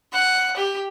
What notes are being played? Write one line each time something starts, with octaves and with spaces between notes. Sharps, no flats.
F#5
G4